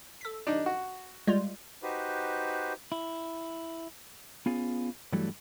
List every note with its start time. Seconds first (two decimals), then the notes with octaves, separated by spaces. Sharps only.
0.21 A4 B6
0.47 D4 D#4
0.66 F#4
1.27 G3 G#3 F4
1.83 D#4 F#4 G4 B4 C5
2.92 E4
4.46 B3 C#4 F4 G#4
5.13 G2 E3 F#3 G3 A3